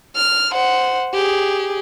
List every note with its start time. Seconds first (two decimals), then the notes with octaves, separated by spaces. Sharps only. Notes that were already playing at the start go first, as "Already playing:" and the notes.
0.16 F6
0.52 C5 F#5
1.13 G4 G#4